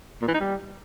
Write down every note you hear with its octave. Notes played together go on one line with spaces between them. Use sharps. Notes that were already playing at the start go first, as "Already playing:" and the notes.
A#2
E3
D#4
G3